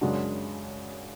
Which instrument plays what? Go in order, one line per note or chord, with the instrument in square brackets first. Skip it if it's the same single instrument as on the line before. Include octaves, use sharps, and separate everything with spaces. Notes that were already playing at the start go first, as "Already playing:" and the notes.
[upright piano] F#2 C#3 G#3 D4 F#4